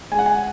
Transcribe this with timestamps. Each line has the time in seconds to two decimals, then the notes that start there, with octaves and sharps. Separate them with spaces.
0.12 G#3 G#5
0.19 F#5
0.26 G#5